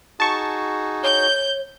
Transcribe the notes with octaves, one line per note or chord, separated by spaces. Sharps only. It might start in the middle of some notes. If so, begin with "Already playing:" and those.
D#4 F#4 G#4 A5 C#6
C#5 G6